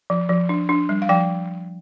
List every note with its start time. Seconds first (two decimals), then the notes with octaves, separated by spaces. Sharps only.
0.10 F3
0.29 F3
0.49 D4
0.69 D4
0.89 G3
1.02 F5
1.09 F3 G5